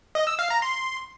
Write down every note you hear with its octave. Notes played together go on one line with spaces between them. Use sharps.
D#5
E6
F5
A#5
C6